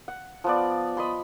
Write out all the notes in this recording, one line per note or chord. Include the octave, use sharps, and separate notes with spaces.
F#5
F3 B3 D5
D#5 B5 C6